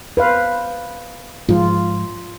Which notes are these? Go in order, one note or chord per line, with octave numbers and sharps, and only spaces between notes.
B4 C5 F5
G#2 F3 F4